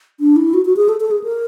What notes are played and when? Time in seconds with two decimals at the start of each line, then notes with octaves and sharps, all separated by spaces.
0.20 D4
0.36 E4
0.54 F#4
0.65 F#4
0.76 G#4
0.89 A4
1.00 A4
1.11 G#4
1.23 A#4